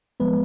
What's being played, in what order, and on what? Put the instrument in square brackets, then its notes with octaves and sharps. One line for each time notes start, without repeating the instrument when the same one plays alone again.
[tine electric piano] F3 G#3 B3 B4